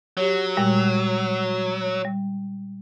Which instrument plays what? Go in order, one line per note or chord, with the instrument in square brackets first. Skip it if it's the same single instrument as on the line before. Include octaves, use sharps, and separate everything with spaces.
[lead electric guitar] F#3 [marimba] G4 C#5
[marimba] A#2 G3 G#3
G3